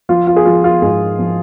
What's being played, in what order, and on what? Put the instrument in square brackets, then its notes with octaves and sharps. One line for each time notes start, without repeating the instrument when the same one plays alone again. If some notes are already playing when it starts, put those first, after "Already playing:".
[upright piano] F3 F4
F4
G#4
F3 F4
F4
G#2 G#4
F3